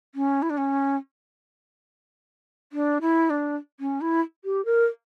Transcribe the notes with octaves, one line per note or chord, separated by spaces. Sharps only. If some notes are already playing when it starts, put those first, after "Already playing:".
C#4
E4
D4
C#4
D4
E4
D4
C#4
E4
G4
A#4